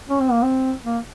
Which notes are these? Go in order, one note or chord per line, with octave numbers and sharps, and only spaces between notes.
C#4
C4
A#3
C4
A#3